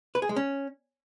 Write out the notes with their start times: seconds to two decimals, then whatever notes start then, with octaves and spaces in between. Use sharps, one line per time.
0.15 B4
0.22 G#4
0.29 G#3
0.36 C#4